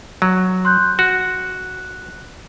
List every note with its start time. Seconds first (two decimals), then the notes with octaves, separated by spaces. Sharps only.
0.22 F#3
0.65 C6 F#6 G6
0.99 F#4 F#6